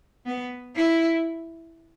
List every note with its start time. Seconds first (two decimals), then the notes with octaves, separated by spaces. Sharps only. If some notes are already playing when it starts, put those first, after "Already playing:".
0.26 B3
0.75 E4